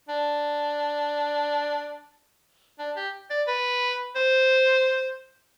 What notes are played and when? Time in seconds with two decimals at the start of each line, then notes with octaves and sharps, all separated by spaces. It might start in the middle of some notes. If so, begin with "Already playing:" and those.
0.09 D4
2.79 D4
2.97 G4
3.30 D5
3.48 B4
4.16 C5